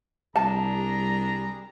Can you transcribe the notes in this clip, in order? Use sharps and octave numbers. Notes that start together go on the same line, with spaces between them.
C2 G3 D4 G#4 A5 A#5